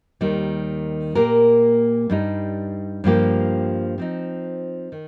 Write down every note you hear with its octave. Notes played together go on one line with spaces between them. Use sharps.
D#2 D#3 G3
A#2 A#3 G4 A#4
G2 G3 D#4
G2 F3 A#3 G4
F3 C4 D#4
D#3